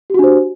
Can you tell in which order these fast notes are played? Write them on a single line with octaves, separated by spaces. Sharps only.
G4 F#4 D4 C5